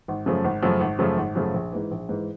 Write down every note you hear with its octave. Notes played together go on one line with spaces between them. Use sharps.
G#1
F#2 C#3 F3 A3
G#1
F#2 C#3 F3 A3
G#1
F#2 C#3 F3 A3
G#1
F#2 C#3 F3 A3
A#1
G#2 E3
A#1
G#2 E3